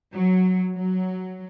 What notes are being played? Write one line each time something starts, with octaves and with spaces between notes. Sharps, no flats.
F#3
F#3